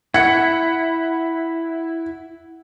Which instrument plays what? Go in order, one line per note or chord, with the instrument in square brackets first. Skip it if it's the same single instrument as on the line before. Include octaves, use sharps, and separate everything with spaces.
[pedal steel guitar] E4 [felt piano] F#5 C#7